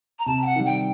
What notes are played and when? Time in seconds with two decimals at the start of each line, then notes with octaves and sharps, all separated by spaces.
0.19 A#5
0.26 C3 A5
0.42 G5
0.46 F#5
0.56 D#3 G3
0.66 G5